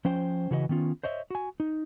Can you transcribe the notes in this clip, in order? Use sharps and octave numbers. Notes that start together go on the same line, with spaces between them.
F3 C#4 C5 G5
C#3 E3 F#4 B4 C5 D#5
D#3 B3 C#4 F4
C5 C#5 D#5 E5
F#4 G#5
D#4